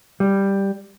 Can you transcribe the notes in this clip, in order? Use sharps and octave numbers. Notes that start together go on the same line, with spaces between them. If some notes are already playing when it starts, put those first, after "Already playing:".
G3